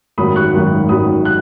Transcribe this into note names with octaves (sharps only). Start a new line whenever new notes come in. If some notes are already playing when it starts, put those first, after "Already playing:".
G#1 F#2 D#3 F#3 B5 D#6
C#6 F#6
G#1 F#2 D#3 F#3
G#1 F#2 D#3 F#3 B5 D#6
F#6